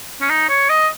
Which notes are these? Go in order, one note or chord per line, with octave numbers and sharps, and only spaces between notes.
C#4
D#4
C#5
D#5